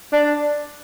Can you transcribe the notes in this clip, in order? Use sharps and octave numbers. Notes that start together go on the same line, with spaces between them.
D4